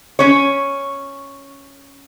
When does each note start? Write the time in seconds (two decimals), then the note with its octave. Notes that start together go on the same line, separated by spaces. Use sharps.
0.19 C#4 C#5